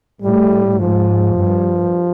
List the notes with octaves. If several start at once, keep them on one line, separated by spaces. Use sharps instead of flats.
A2 G3
G#2 F3
G2